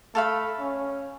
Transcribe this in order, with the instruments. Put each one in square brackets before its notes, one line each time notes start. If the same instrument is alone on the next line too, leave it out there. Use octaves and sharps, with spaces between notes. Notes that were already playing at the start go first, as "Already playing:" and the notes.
[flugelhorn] A3 [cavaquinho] A4 F5 B5
[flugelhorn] C#4